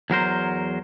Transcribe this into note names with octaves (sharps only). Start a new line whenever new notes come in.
E2 F#3 A#4 C5